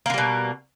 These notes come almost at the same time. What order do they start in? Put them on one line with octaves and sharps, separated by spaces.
A#3 D3 G3 B2